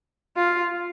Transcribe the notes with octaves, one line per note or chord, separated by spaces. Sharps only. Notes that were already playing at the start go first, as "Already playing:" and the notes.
F4